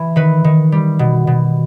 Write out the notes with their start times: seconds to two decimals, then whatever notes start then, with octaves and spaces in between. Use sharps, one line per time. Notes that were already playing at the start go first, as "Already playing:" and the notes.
Already playing: E3
0.16 D#3 B4
0.44 D#3
0.72 G3
0.99 B2
1.27 B2